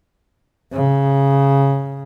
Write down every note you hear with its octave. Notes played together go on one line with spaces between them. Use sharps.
C#3